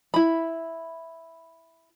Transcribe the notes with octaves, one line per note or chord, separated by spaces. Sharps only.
E4 B5